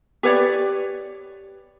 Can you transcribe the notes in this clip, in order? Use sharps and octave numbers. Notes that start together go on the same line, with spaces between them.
G4 B4 C#5 D5